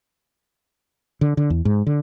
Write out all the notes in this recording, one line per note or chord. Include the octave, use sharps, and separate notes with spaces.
D3
D3
E2
G#2
D3